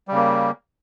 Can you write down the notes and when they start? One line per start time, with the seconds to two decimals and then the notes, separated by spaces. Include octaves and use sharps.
0.08 G3
0.11 C#3
0.15 A#3